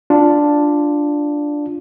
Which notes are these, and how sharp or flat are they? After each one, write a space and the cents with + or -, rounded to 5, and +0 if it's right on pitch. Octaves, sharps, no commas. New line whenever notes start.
D4 +0 F4 +0